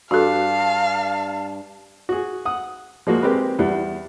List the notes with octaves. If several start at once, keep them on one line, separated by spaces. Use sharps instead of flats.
G2 F#4 A4 F5 A5
F#4 G#4
F#5 D#6
F3 G#3 A#3 F#4
G#3 C4 G4 A#4 B4
E2 G3